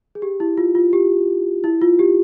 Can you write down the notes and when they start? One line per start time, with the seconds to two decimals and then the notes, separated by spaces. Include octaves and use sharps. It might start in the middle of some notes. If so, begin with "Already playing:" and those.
0.15 G#4
0.22 G4
0.40 E4
0.58 F4
0.75 F4
0.93 G4
1.64 E4
1.82 F4
1.99 G4